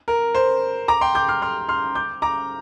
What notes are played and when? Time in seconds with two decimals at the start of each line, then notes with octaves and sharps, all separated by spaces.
0.08 A#4
0.35 C5
0.88 A#5 D6
1.01 G5 C6
1.15 D6 G6
1.28 C6 F6
1.42 C6 F6
1.69 C6 F6
1.95 D6 G6
2.22 A#5 D6